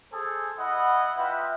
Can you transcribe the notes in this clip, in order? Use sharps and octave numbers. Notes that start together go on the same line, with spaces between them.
G#4 A4 C5 G#5
E4 D#5 F#5 B5
F4 B4 E5 G5